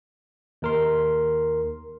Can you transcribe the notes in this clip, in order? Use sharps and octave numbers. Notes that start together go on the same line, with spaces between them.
D#2 A#4 C6